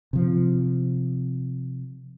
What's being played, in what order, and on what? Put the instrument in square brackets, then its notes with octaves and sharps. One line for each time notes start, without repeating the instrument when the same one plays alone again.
[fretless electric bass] C3 F3